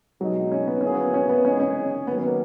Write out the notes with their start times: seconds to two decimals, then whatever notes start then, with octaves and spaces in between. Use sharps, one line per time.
0.20 B2 F#3 G#3 D#4
0.52 C#4
0.67 B3
0.81 F#3 A#3 C#4 E4 G#4
0.94 B3
1.14 C#4
1.29 B3
1.44 E3 G#3 C#4 D#4 G#4
1.60 C#4
2.06 D#3 F#3 B3 C#4
2.17 B3
2.27 A#3